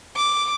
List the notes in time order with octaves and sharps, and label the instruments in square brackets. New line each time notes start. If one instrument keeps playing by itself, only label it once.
[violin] D6